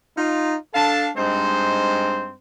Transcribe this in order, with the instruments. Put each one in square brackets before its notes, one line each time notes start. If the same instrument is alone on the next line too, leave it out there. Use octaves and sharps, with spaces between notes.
[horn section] D#4 F4
D4 A4 F5 A5
G2 G#3 C4 D#4 C5